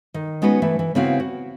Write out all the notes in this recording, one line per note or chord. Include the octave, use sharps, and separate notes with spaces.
D#3
G#3 B3 C#4 D#4 F#4 B4
E3 A3
E3
C#3 B3 C4 E4 F#4 F5
F#4